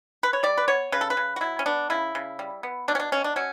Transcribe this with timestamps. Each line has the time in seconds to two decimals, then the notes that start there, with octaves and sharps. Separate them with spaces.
0.23 B4
0.33 C#5
0.43 G3 D5
0.58 B4
0.68 B3 C#5
0.92 C#3 B4
1.01 A4
1.10 B4
1.17 C#3
1.36 F#4
1.41 F#3 E4
1.59 C#4
1.66 B3 D4
1.90 C#3 E4
2.15 C#3
2.39 G3
2.63 B3
2.88 B2 D4
2.95 C#4
3.00 D4
3.12 B2 C#4
3.24 D4
3.36 F#3 C#4